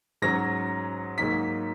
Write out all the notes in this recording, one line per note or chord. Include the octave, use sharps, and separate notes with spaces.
G#2 F#3 C#4 A#6
G#2 F#3 A#3 D#4 B6